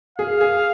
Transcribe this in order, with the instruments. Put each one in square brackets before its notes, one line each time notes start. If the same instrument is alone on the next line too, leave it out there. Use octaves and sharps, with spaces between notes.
[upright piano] G#4 [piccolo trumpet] F5
[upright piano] G#4